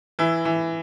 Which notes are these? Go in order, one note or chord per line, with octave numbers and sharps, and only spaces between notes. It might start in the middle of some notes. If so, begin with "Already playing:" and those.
E3 E4
E3